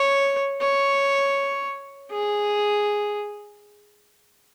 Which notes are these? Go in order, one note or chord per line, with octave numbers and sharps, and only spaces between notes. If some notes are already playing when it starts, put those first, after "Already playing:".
Already playing: C#5
C#5
G#4